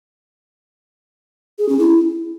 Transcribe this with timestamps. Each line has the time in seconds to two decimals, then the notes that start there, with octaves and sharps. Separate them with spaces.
1.59 G#4
1.69 C#4
1.79 E4